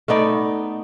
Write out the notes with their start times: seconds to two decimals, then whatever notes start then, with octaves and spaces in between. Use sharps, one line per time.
0.08 A3 B3 D#4 D5